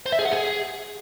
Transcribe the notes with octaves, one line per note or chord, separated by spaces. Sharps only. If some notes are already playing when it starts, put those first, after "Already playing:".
C5
E5
G#4
F#5
G#4